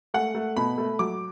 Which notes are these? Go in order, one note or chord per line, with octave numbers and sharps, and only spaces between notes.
A3 F#5
A3
B2 B5
A3
F#3 D6